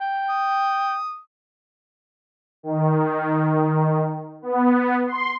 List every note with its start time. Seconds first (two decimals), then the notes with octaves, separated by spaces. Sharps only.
0.01 G5
0.29 D#6
2.63 D#3
4.42 B3
5.07 C6